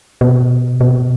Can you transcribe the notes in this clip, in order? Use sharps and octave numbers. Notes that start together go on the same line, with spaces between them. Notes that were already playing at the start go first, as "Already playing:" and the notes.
B2
B2